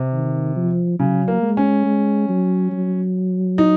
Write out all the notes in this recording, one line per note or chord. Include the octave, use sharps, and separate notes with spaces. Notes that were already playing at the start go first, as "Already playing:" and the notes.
Already playing: C3
D#3
F3
C#3 F#3
A#3
G#3
C#4
G#3
F#3
F#3
D#4